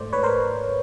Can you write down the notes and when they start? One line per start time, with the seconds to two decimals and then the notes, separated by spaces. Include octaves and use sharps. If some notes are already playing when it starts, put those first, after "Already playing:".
Already playing: G#2 A3 C5 D5
0.13 G#2 B4 C#5
0.23 A#4 C5